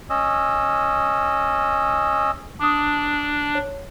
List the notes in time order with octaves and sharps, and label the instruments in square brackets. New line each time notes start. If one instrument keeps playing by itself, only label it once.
[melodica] C#4 D#5 E6
[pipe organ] D4 [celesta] D6 D#6
[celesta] C#5